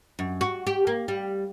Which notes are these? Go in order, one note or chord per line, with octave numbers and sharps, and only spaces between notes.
F#2
F#4
G4
A#3
G3